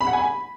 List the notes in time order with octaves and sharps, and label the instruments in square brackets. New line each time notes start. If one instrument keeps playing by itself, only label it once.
[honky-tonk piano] B5
F#5
G#5
B5